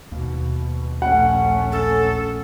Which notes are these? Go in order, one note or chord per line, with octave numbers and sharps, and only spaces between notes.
D#2 B2 A#3
A#1 A3 C#4 F#5
A4